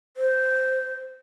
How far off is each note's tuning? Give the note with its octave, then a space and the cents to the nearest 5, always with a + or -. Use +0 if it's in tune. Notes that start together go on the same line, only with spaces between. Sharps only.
C5 -10